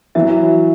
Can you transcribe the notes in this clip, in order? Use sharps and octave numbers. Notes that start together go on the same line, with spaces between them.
E3 F#3 E5